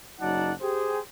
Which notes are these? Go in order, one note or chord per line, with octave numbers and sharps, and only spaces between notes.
F#1 F#3 D#4 D5 F#5 A5
G4 G#4 C5